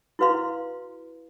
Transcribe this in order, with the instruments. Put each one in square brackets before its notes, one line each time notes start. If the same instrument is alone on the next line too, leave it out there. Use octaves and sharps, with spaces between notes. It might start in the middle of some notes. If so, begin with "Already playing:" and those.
[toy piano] E4 F#4 B4 F5 C6